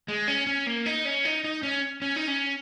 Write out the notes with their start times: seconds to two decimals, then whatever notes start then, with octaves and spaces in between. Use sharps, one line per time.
0.08 G#3
0.28 C#4
0.47 C#4
0.67 A#3
0.86 D#4
1.05 C#4
1.25 D#4
1.44 D#4
1.63 C#4
2.02 C#4
2.16 D#4
2.28 C#4